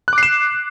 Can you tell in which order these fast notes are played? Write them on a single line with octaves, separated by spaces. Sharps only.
F#6 D6 C7 E7